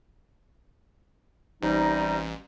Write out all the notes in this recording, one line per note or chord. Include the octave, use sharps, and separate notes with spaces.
A1 C3 G3 D#4